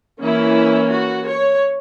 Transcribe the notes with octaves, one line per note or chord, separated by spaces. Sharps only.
E3 A#3 C#4 E4
F#4
C#5